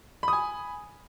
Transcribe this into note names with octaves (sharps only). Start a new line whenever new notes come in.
G#5 B5 D#6